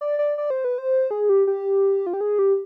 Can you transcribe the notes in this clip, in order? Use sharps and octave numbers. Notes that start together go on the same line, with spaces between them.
D5
D5
D5
C5
B4
C5
G#4
G4
G4
F4
G4
G#4
G4